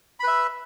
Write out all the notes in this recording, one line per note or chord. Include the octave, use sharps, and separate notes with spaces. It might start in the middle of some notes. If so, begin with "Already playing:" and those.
B4 E5 B5